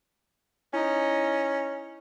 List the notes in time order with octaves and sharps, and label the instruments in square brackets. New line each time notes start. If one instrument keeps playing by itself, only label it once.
[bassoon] C#4 [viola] D#4 [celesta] E4